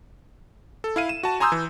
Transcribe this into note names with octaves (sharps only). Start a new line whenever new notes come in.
A4
E4 F5 D#7
E7
F#4 A5
G#5 A#5 C6 D#6 E6 G6
E3